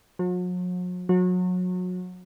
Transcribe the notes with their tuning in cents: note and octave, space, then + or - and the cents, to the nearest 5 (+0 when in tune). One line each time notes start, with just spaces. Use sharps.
F#3 -45
F#3 -30